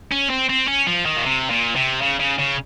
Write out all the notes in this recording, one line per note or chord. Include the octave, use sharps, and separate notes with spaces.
C#4
C4
C4
C#4
F3
D#3
A#2
C3
A#2
C3
C#3
C#3
C#3